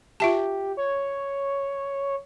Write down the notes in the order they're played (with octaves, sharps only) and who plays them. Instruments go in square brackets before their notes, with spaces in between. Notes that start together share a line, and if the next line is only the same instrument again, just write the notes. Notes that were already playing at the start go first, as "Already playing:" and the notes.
[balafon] F4 E5 A5 [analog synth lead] G4
[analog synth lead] C#5